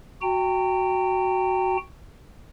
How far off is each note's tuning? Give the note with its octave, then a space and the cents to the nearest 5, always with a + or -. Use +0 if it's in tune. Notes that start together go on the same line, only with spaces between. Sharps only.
F#4 +0 G5 +5 A#5 -40